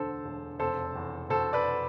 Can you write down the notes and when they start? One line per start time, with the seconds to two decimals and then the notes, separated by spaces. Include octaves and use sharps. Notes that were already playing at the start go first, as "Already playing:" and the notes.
Already playing: E1 D2 D3 A4 C5
0.25 E1
0.59 F1 A4 C5
0.96 E2
1.30 B2 A4 C5
1.53 B4 D5